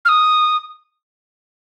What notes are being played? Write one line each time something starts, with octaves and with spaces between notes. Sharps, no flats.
F6
D#6